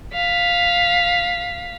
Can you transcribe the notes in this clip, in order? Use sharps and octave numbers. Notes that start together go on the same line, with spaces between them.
F5 B6